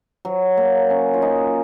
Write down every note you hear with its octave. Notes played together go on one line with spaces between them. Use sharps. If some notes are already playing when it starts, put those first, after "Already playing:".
F#3
A#3
C#4
F4
D#4